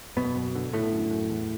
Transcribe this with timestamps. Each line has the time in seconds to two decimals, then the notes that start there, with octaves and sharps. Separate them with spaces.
0.17 F#2 B2 B3
0.35 F#2
0.55 D3
0.73 A2 D3 A3
0.93 F#2
1.10 F#2
1.30 E2